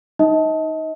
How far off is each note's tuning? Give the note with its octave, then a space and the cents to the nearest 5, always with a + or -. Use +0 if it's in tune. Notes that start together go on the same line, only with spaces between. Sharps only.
D#4 +0 D#5 +35